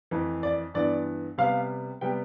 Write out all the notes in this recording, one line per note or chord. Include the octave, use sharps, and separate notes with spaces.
F2 E3 A3
D5
G2 E3 B3 D5
C3 G3 B3 F5
C3 G3 B3 G5